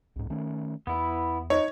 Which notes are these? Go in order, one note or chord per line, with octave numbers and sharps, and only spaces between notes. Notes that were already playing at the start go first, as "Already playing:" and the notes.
C2 G#2
D#3 A3 C#4
E2 B3 E4
D#4 C#5